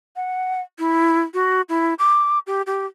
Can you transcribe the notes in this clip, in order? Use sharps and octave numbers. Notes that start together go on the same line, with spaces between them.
F#5
E4
F#4
E4
D6
G4
G4